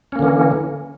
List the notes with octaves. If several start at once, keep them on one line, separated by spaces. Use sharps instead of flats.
D3 E3 A#3 C#4